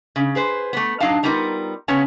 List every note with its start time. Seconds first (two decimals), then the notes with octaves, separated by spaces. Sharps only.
0.16 C#3
0.35 G#4 B4 C5
0.73 A3 B3
1.00 F#3 D4 D#4 F5 A5
1.23 G3 B3 D#4 F4 A#4
1.88 C#3 B3 C#4 C#5 A5